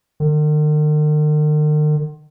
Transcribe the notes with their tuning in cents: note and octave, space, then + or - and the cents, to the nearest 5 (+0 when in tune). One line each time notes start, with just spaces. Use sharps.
D#3 -45